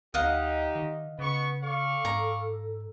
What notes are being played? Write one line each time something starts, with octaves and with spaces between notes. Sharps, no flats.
D2 D#4 G4 D#5 F5 F#5
D#3
C#3 B3 C#6
A4 D5 F5 C#6
G#2 A#5